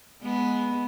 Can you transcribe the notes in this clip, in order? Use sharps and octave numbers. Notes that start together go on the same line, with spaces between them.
G#3 B3